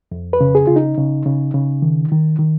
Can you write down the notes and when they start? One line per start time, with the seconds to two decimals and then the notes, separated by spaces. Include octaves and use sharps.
0.12 F2
0.33 B4
0.41 C#3
0.55 G#4
0.67 C#3 F4
0.76 D#4
0.97 C#3
1.26 C#3
1.54 C#3
1.82 D#3
2.12 D#3
2.39 D#3